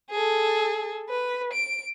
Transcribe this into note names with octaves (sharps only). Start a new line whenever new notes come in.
G#4 A4
B4
D7